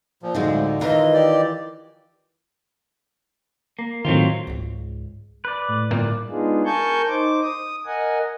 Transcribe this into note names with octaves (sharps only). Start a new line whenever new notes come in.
A#2 F3
D2 A2 D3 F3 G#3 C4 D#4
D#3 E3 F4 A#4 D#5
G4 D5
A#3
A2 D#3 F#3 C4 F4
C#2 G#2
B4 D5
A2
G1 A#2 A#3
G#3 B3 D4 D#4 F4 G#4
A#4 G#5 A5 C#6 G6
D#4 C5 D6
D#6
A#4 D#5 F#5 G#5